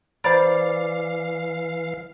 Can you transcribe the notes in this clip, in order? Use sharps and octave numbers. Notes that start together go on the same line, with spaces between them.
E3 C5 D5 F5 A#5 B5